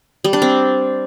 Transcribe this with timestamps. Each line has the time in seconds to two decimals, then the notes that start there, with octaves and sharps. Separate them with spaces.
0.24 G3
0.33 D4
0.42 C4